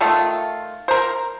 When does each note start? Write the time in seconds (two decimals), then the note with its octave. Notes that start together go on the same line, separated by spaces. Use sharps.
0.01 D#3 A3 F4
0.88 A#4 C5